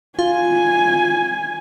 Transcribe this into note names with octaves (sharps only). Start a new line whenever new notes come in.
F4 G#5